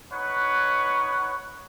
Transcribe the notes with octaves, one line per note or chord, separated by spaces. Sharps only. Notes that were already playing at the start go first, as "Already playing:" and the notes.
D#4 B4 C#5 F#5 C#6